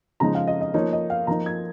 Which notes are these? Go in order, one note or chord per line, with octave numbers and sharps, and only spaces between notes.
C#3 F3 G#3 D#4 A#5
F5
D#5
D#5
F3 A#3 D#4 C#5
D#5
F5
F3 A#3 D#4 A#5
G#6